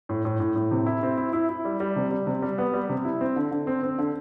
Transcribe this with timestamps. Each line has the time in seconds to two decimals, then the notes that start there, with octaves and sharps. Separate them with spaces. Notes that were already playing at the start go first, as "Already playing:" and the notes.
0.09 A2
0.25 A2
0.40 A2
0.56 A2
0.71 C3
0.86 E4
1.03 C4
1.18 E4
1.33 E4
1.49 E4
1.65 G3
1.80 G3
1.96 C3
2.11 G3
2.27 C3
2.42 G3
2.58 B3
2.73 G3
2.89 C3
3.05 E4
3.21 C4
3.36 D3
3.51 D3
3.67 C4
3.83 C4
3.98 D3